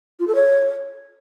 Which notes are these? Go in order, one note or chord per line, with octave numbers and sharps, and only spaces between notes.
F4
A4
C#5